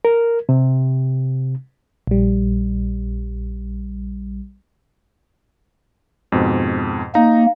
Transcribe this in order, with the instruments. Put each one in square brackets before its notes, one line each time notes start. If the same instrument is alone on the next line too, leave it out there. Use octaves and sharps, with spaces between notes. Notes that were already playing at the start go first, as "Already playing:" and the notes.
[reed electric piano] A#4
C3
[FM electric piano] A#1 G3
[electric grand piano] F2 G#2 B2
[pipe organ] A#3 [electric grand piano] D#4 A#5